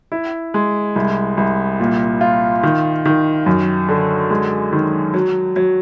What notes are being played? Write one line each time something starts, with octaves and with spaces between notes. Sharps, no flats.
E4
G#3
C2
C2
A#2
F4
D#3
D#3
F#2
D3
G#3
D#3
F#3
F#3